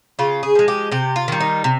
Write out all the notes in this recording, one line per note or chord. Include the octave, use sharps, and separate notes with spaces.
C#3 F4
G#4
F3 G#3
G4
C3 G4
F4
D#3 G3
D#4
C3